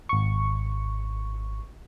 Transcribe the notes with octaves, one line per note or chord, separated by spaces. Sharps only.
G#1 C#6